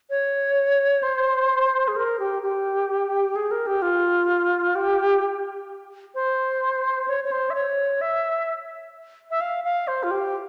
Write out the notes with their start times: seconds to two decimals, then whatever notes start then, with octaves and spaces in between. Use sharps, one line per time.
0.10 C#5
1.03 C5
1.88 G#4
1.96 A#4
2.19 G4
2.43 G4
3.36 G#4
3.51 A#4
3.67 G4
3.82 F4
4.76 G4
6.15 C5
7.08 C#5
7.24 C#5
7.32 C5
7.50 E5
7.55 C#5
8.01 E5
9.31 E5
9.41 F5
9.64 F5
9.88 C5
10.03 F4
10.11 G4